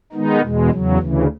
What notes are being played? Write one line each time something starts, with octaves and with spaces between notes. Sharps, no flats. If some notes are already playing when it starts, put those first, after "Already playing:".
D#3 G#3 B3 D#4
E2 B2 G#3
E2 C#3 F#3
D2 C#3 E3